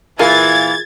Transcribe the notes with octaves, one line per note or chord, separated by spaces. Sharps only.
A#2 E3 F4 G#4 A#4 F5 G#6 A6